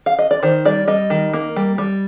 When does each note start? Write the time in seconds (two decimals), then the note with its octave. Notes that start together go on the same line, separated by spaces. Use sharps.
0.06 F5
0.19 D#5
0.31 D5
0.43 D#3 C5
0.65 G3 D5
0.88 G3 D#5
1.10 D#3
1.33 A#3
1.56 G3
1.78 G3